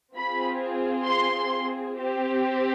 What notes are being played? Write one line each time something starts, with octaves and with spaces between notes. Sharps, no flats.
C4 F4 G#4 B5
C6
C4 G4